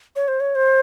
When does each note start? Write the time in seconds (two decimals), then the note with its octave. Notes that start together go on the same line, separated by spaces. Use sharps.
0.16 C#5
0.28 C5
0.40 C#5
0.55 C5